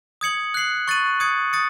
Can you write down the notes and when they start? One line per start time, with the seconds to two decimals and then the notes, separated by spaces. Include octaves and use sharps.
0.21 D#6 G#6 C#7 F#7
0.54 F#6 C7 F#7
0.88 C#6 F#6 A6 D#7 F#7
1.20 D#6 G#6 C#7
1.53 D#6 A6 C#7